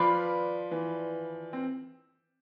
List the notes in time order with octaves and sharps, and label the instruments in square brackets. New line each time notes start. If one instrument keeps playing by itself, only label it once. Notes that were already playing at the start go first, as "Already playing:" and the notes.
Already playing: [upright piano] F3 [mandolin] F4 B4 D5
[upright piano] E3
C4